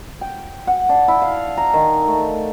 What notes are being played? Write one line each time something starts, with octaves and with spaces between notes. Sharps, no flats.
G5
F#5
D4
E4
F5
A#5
D#3
A3